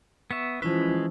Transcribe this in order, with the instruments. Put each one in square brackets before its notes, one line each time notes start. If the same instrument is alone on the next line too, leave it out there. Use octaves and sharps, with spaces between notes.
[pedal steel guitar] B3 E5 [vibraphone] C#6
[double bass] E3 F3 [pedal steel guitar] G#3 B4 [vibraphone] C#4 E4 F4